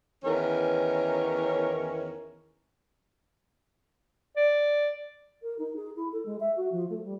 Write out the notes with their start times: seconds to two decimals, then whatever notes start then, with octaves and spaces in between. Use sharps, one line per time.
0.24 E2 D#3 E3 C#4 A#4 C#5
4.36 D5
5.42 A#4
5.58 D#4
5.76 G#4
5.96 E4
6.12 A4
6.25 G#3
6.40 E5
6.56 F#4
6.71 F3
6.89 A3
7.04 G3